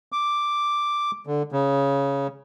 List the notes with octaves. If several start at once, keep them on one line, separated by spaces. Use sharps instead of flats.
D6
D3
C#3